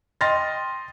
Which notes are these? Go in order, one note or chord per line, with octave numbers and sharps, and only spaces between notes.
D#5 G5 C6 F6 A6 A#6